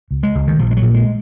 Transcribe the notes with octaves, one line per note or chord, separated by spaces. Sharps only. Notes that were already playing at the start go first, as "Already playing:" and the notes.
C#2
G#3
C#2
D#3
A#1 F3
G#3
F#3
A#2
G#3